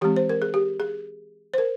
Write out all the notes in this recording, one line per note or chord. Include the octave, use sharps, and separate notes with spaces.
E3 G#3 C4 G4
C5
A#4
G#4
G4
G#4
C5
A#4